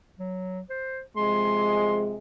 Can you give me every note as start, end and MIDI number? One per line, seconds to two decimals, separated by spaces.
0.19 0.60 54
0.70 1.01 72
1.17 2.15 48
1.17 2.15 53
1.17 2.15 56
1.17 2.00 84